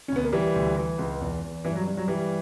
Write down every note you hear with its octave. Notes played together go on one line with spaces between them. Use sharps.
C#4
D2 B3
A#3
E3 G3
D2
E3
C#2
E2
E2
G2 E3
F#3
G2
F#3
E3 G3